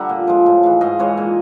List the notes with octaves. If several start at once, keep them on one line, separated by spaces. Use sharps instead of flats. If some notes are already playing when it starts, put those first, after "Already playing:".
Already playing: D3 G3 E5 F#5 A#5
A#2
F3 G#3
A2
E3 G#3
G#2 D#5 F5
E3 G#3 C#5 D#5
A#2